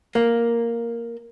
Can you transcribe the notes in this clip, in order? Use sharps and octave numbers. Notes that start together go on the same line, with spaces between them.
A#3